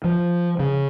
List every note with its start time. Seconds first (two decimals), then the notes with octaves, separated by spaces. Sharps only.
0.04 F3
0.59 C#3